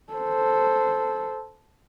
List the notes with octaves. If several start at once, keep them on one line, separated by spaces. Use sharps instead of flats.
A4 C5